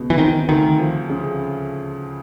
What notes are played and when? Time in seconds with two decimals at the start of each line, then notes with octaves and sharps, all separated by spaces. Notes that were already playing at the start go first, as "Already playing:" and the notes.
Already playing: C#2 B2
0.10 E3
0.18 D#3 C4
0.48 D2 D#3
0.79 F3
1.10 C#3